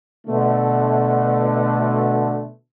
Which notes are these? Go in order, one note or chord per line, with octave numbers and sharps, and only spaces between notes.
B2 D3 A3